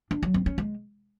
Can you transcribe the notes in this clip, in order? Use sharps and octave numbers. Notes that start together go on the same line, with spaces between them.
D4
F#3
C4
C#4
G#3